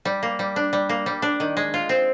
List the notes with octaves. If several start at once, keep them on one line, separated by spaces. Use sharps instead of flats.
G3
A#3
G3
D4
G3
A#3
G3
D4
D#3
G#3
F4
C4